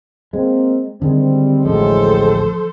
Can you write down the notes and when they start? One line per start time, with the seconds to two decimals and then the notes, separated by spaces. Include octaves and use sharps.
0.33 G#3 A#3 C4
1.02 D3 D#3 G3 G#3 C4
1.65 A1 D2 A2 F3 G#3 A4 C5